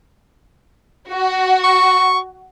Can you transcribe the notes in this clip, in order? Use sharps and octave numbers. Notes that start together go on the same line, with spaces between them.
F#4
C#6